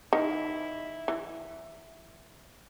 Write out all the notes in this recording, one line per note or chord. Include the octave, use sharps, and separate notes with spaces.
D#3 E4
E3